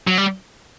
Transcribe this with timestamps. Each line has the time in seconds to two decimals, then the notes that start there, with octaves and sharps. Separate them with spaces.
0.07 F#3
0.18 G3